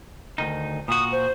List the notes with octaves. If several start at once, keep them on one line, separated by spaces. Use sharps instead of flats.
D2 D#3 D#4
A#2 F#4 D#6
C5